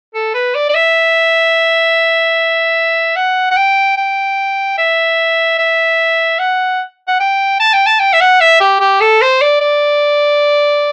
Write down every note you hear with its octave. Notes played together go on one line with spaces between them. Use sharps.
A4
B4
D5
D5
E5
F#5
F#5
G5
G5
E5
E5
F#5
F#5
G5
A5
G5
A5
G5
E5
F#5
E5
G4
G4
A4
C5
D5
D5